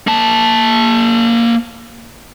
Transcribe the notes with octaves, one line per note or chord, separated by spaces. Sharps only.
A#3 A5